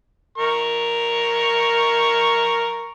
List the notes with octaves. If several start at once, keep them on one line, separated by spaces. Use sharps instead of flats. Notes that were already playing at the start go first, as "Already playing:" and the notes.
A#4 C#6